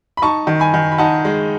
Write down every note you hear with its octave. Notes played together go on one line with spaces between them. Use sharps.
B5
D#4 A5 C#6
D#3
G#5 B5
D#3
B5
D#4 F#5 A5
G#3